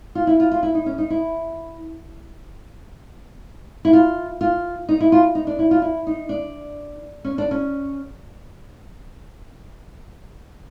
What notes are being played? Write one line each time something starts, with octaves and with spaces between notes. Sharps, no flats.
F4
E4
F4
F4
E4
D#4
C#4
D#4
E4
E4
F4
F4
D#4
E4
F4
D#4
D4
E4
F4
E4
D#4
D4
C#4
D4
C#4